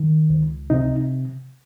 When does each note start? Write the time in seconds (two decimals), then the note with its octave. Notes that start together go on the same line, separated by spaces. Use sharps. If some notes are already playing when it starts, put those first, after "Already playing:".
Already playing: D#3
0.30 C#2
0.70 C3 D#4